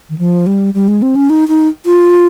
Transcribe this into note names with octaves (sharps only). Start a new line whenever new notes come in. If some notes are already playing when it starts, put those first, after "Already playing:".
D#3
F3
G3
G3
G#3
C4
C#4
D#4
D#4
F4